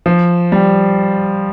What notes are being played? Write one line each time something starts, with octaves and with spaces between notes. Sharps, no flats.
F3
G3